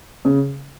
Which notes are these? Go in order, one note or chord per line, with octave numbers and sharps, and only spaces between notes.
C#3